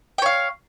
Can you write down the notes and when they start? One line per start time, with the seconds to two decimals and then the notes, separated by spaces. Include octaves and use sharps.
0.18 G5
0.22 C#5
0.26 F5